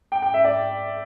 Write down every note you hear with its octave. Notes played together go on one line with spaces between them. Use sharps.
G5
G5
E5
D5